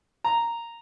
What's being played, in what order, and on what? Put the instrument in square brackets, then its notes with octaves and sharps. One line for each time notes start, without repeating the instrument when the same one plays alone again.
[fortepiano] A#5